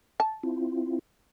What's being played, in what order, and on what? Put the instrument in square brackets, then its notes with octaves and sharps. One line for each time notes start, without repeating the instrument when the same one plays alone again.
[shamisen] A5
[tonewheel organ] C4 E4 F4